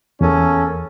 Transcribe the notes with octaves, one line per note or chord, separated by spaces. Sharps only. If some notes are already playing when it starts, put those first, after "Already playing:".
E2 A#3 C#4 A4